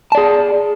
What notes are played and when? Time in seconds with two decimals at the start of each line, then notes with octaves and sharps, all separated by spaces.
0.12 A5
0.15 D5
0.17 G#4